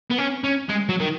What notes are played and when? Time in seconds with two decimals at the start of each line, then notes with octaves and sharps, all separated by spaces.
0.10 B3
0.18 C#4
0.44 C#4
0.69 G#3
0.89 F#3
1.00 D#3